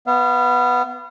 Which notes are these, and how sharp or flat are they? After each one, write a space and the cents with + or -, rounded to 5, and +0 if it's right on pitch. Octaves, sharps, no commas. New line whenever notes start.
B3 +0 F5 -35